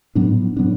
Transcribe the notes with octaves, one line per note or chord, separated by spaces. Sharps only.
A2 F#3 B3 D4
A2 F#3 B3 D4